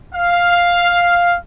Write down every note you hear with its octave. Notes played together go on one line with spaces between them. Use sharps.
F5